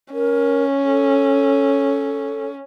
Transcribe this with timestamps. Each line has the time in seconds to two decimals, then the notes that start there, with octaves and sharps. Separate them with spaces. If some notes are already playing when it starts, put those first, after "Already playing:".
0.13 C#4 A#4
0.84 A4